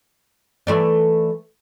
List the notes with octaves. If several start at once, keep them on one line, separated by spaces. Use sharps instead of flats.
E3 A3 D5